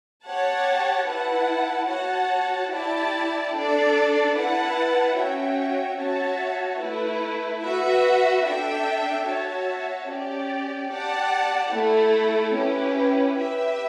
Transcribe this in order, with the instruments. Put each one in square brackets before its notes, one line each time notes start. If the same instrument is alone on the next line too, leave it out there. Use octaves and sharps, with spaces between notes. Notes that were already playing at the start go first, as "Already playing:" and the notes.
[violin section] G4 C#5 F#5 A5
E4 B4 F#5 A5
F#4 C#5 F#5 A5
E4 G4 D5 A5
D4 A4 D5
E4 B4 F#5 A5
C#4 F#4 C#5 E5 G5
F#4 C#5 E5 A5
A3 E4 B4
F#4 B4 E5
D4 A4 E5 G5
F#4 C#5 E5 A5
C#4 G4 D5
G4 D5 F#5 A5
A3 E4 A4
C#4 E4 G4 B4
G4 B4 E5